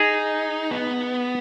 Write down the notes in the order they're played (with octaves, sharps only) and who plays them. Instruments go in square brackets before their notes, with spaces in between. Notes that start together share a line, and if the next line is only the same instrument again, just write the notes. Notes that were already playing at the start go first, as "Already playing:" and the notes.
Already playing: [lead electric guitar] D#4 [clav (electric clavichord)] G#4
[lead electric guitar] B3